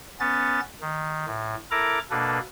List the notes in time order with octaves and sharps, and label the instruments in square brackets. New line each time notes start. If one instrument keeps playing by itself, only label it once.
[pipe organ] B3 C#4 A6
D#3
A2
E4 A4 A#4 A#5 D6
B2 A#3 D4 A4 B4